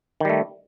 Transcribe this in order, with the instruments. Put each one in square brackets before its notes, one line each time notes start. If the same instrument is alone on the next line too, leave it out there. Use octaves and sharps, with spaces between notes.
[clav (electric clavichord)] D#3
G3
A3